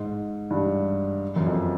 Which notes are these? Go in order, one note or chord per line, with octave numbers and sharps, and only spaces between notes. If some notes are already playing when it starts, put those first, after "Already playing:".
Already playing: G#2
G2
F#2
F2